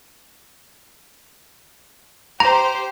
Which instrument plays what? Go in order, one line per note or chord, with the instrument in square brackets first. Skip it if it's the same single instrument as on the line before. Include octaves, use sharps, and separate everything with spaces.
[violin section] G4 C5 [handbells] A#5